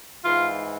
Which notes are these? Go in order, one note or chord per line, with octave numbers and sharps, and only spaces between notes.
G#2 E3 F4